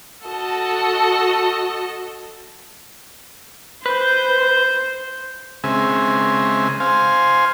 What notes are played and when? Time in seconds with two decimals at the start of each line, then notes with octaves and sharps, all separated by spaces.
0.24 F#4 A4 D#5 A5
3.86 B4 C5 G6
5.64 C#3 G#3 C4 E5 G#5
6.80 C5 F5 G#5